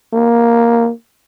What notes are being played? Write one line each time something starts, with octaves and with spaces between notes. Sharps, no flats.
A#3